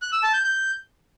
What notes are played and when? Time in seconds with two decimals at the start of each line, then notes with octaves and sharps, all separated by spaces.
0.02 F#6
0.12 E6
0.23 A5
0.33 G6
0.44 G6